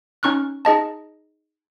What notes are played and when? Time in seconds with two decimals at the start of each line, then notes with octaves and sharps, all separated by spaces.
0.23 C#4 D#4 C#6 F6 F#6
0.65 D#4 G#4 D#5 A5